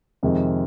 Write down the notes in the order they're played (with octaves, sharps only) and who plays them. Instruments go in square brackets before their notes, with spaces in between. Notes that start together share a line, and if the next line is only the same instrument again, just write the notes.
[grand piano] F2 C3 D#3 G#3